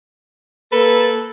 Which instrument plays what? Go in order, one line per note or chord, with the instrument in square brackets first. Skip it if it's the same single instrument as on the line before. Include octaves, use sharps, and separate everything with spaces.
[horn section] A#3 A4 [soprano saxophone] B4